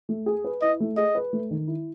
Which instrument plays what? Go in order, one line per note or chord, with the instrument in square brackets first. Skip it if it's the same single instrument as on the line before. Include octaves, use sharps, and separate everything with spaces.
[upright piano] A3
G#4
B4
[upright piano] E4 [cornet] D#5
[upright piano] A3
[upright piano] G#4 [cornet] D#5
[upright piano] B4
A3
D#3
E4